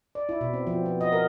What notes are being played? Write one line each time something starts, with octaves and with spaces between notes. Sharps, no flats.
D5
E4
B2
C4
F3
B3
D#5
A#4